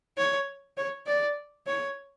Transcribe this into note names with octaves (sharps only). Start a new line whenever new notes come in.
C#5
C#5
D5
C#5